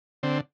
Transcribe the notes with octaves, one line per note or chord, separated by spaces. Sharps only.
D3 C4